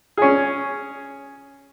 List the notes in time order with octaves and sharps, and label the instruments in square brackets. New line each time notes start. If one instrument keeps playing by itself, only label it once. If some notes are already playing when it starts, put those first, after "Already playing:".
[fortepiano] C#4 G#4